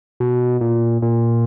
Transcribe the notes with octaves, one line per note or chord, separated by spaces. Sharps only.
B2
A#2
A#2